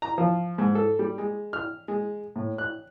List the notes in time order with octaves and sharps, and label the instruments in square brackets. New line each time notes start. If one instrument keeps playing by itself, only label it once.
[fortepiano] A#5
F3
G#2
A4
G3
G#3
F6
G#3
A2
F#6